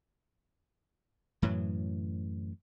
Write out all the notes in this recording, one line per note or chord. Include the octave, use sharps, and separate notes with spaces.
F#2 A2 E3 F#3